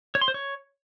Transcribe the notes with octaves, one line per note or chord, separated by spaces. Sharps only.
C#5
C6
C5
C#5